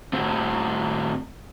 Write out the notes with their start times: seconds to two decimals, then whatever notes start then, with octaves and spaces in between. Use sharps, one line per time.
0.13 A2 C4